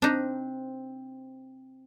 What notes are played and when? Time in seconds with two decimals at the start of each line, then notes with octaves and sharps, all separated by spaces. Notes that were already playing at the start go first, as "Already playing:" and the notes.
0.02 C4 D4 D#4